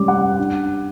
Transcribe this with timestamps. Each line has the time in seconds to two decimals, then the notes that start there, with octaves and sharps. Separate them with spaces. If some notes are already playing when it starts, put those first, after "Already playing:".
Already playing: G3 C#4 D6
0.08 F#5
0.39 D4